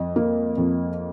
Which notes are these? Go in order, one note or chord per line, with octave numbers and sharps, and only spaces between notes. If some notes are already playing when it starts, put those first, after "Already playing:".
Already playing: F2 D#5
A#3
F2